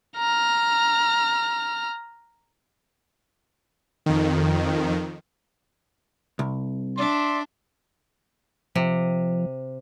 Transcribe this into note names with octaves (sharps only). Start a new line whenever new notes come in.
A#5 F6
F2 D#3
C2
D4 D5 E5 C6
C3 F3